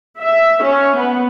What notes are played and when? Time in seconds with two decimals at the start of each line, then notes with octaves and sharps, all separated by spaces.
0.20 E5
0.63 C#4
0.97 B3